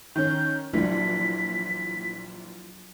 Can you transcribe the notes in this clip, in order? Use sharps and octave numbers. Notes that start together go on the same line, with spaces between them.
D#3 C#4 G6
A#1 A#2 E3 F#3 D4 B6